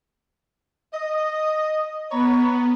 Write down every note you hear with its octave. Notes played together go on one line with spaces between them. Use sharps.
D#5
B3 C#5 A#5 B5